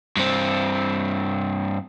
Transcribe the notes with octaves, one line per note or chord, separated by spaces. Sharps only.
G2 C4